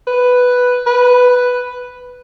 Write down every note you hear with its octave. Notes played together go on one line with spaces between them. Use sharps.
B4
B4